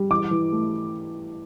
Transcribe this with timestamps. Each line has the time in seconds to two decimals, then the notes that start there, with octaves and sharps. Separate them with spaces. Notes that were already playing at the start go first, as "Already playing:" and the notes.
Already playing: G3
0.11 E3 D6
0.31 E3
0.52 A3